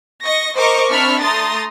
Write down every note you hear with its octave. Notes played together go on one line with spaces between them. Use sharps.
D#5 C#6 A#6
A#4 C5 D#5 C#6 D6
C4 D4 E5 B5 C#6 F6
A3 A#5 C6 D#6 A6